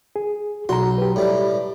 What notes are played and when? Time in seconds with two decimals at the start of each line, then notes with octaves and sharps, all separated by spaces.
0.16 G#4
0.69 B1 F#4 A#5 C6
0.98 G4 B4
1.16 A2 G3